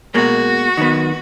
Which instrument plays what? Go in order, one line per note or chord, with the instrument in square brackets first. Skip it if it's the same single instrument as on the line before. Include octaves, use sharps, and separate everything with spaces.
[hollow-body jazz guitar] B2 G#3 A#3 [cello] F#4
[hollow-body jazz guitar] D#3 F#3 B3